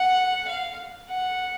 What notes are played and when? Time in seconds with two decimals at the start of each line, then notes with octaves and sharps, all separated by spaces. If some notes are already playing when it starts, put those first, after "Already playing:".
Already playing: F#5
0.48 F5
1.09 F#5